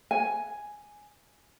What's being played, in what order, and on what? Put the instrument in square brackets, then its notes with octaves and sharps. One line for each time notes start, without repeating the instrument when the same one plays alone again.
[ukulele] G#5